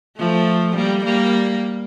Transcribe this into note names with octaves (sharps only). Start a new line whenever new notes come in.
F3 A3
G3 A#3
G3 A#3